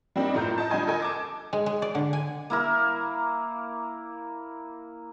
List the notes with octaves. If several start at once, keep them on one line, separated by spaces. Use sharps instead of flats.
G3 A#3 C4 D4 D#4 G4
F#2 A2 A3 F4 A#5 G6
D#5 A5
D3 G3 F4 D#5 G#5 G#6
A4 A#4 D#5 G#5
A5 D6 G#6
G#3
G#3
D5
D3
G#5
A#3 E4 A#4